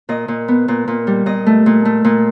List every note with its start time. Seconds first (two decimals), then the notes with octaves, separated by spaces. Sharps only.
0.09 A#2 D#5
0.28 A#2
0.48 B3
0.68 A#2
0.88 A#2
1.07 G3
1.26 A#2 D#5
1.46 A3
1.66 A#2
1.85 A3
2.04 A#2